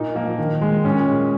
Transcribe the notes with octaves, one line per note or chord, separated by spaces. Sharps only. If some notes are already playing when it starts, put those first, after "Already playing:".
Already playing: A#2 D#4
F3 A#3
D#3
G#3
A#2 C#4
G#3